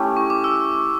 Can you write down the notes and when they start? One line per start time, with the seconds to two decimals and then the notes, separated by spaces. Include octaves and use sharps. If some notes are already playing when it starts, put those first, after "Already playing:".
Already playing: A3 C#4 E4 G4
0.17 C#6
0.30 D6
0.44 E6